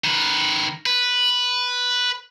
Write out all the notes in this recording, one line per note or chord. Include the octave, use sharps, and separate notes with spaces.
D#3 B4
B4